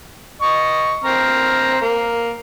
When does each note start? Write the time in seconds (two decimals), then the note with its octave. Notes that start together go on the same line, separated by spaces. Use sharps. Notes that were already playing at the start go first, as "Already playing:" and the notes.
0.42 D#5 C#6
1.05 C4 A#5 F6
1.81 A#3